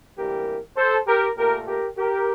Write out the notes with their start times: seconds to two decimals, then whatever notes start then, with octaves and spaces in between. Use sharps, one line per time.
0.17 D2 C3 E3 G3 A#3 G4 A#4
0.77 A4 C5
1.07 G4 A#4
1.38 A#2 A3 G4 A#4
1.67 G4 A#4
1.97 G4 A#4